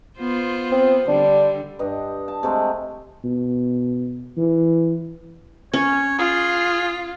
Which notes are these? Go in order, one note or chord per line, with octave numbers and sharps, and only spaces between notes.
B3 F4 C5
C4
D3 G3 D4
G2 D#5
A5
C3 G#3 A3
B2
E3
C#4 C#5
F4 G#4